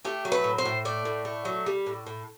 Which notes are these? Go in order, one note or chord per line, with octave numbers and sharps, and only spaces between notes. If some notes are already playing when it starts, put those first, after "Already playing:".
A3 G4
F#3
B4
A2
C5
A2
A3 D5
A2
A3
F#3
G3
A2
A2